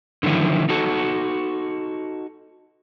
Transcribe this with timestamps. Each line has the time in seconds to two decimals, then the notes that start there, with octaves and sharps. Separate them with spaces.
0.23 D3 D#3 F3 F#3 E4
0.69 D#4 F#4 A4